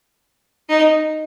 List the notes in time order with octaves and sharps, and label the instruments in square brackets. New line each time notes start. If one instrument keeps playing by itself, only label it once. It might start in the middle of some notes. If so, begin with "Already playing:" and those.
[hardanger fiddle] D#4